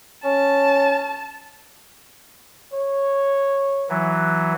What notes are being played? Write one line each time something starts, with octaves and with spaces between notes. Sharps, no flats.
C#4 A5
C#5
E3 F#3